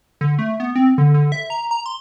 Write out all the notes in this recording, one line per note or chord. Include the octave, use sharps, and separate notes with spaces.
D3
A3
B3
C4
D3
D3
E5
A#5
A#5
C6